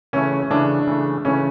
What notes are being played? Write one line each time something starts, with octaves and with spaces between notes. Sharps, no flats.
C#3 E3 A3 C#4
C#3 E3 A3 D4
C#3 E3 A3
C#3 E3 A3 C#4